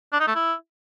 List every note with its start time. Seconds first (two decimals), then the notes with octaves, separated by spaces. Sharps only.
0.13 D4
0.20 D#4
0.28 A3
0.35 E4